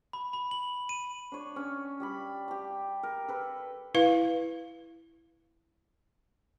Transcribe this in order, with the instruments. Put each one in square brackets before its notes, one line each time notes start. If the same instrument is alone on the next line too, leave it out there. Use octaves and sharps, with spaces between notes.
[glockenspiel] B5
B5
F#7
D#7
[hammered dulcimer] D4 C#5
C#4
G3 D5 B5
G4 A5
A#4
A4 B4
[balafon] E4 B4 F5